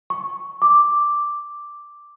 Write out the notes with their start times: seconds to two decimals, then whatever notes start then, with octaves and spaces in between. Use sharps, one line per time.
0.10 C#6
0.62 D6